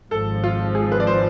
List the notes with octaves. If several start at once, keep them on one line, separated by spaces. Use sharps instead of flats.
G#1 G#2 F3 A4
F4
G#4
B4
D5
C5